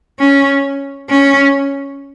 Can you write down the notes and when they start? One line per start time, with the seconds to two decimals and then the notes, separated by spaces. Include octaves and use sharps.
0.19 C#4
1.09 C#4